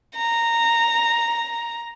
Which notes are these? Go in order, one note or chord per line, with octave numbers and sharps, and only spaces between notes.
A#5